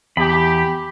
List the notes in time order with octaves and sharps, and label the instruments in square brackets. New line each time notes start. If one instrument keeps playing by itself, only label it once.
[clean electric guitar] E2 [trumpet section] G4 [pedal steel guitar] B5